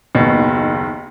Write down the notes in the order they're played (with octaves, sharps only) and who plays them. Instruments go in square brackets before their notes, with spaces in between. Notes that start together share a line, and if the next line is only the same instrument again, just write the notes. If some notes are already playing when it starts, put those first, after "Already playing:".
[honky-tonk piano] F#1 D#2 [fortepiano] B2